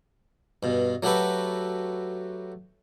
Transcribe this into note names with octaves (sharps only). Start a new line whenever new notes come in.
G2 B2
F#3 A3 F#4 G4 A4 B4